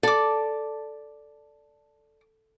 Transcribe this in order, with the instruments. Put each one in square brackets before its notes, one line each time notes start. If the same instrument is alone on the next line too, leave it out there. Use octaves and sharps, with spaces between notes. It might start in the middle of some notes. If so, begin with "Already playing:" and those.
[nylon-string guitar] A4 [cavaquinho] D5 D6